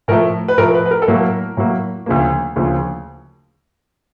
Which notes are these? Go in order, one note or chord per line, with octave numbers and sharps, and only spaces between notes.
A2 F3 A3 A#4
B4
A2 F3 A3 A#4
B4
B4
A#4
A4
A2 F#3 A#3 A#4
A2 F#3 A#3
D2 C#3 F3 A#3
D2 C#3 F3 A#3